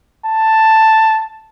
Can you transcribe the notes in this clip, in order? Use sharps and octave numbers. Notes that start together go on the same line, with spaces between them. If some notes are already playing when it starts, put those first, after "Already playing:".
A5